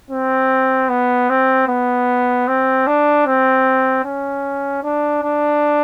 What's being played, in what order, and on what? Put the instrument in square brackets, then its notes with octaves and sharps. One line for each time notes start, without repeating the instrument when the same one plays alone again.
[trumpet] C4
B3
C4
B3
C4
D4
C4
C#4
D4
D4